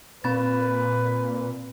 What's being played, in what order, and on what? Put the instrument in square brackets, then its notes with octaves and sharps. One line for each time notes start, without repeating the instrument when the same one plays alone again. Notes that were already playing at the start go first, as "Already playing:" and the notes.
[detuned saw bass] A#2 [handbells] C4 B5 A6 [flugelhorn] B4